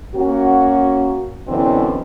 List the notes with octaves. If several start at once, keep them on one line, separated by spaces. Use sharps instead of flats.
A#3 C#4 F#4
F#2 B2 D3 E3 C4